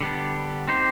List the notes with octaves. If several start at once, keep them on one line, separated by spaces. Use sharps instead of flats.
D3 G3 B3 D4
C4 D#4 G4 C5